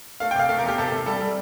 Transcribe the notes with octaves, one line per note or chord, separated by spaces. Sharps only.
A3 F5
G5
C3 F5
A3 F5
A#4
E2 G4
C3 A4
C3
G3 A4
G3